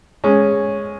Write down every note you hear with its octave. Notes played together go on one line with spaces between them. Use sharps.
G#3 C#4